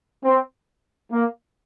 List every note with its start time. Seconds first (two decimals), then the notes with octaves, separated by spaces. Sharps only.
0.24 C4
1.11 A#3